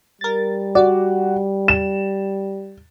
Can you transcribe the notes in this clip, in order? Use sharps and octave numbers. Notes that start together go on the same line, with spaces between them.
G3 A#4 A6
F#4 D5
E7